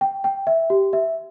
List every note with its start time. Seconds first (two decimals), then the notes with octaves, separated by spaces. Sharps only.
0.01 G5
0.24 G5
0.47 E5
0.70 G4
0.93 E5